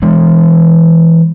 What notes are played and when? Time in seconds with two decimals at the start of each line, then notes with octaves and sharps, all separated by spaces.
0.02 E3 G#3 D4